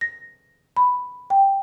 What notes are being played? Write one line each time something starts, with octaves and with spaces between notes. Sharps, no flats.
A#6
B5
G5